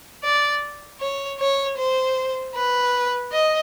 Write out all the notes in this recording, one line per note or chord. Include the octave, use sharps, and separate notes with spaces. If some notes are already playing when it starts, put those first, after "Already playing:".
D5
C#5
C#5
C5
B4
D#5